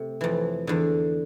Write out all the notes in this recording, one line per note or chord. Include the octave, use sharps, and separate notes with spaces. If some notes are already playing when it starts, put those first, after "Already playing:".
Already playing: C3 A3
F2 E3
E2 D3